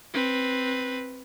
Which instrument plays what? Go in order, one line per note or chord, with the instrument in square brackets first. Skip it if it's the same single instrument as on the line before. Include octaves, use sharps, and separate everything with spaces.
[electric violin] C4 B4